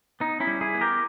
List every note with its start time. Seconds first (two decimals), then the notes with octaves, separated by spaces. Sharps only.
0.20 B3 D#4
0.40 C#4 E4
0.47 G3
0.61 E4 G#4
0.74 B3
0.81 G4 A#4